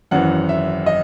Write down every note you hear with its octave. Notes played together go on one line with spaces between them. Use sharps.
G#1 F#2 E3 F#5
E5
D#5